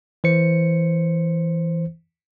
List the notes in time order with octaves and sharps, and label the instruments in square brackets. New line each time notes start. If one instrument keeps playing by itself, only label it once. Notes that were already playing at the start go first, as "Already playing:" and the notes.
[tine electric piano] E3 C5 C#7